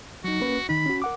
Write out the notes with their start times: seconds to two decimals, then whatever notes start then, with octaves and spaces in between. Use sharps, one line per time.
0.24 F#3 D#4 F#4
0.40 A#3 C#4 B4
0.69 D#3 D#4 B5
0.86 C#4 F#4
1.02 A#4 F#5 D6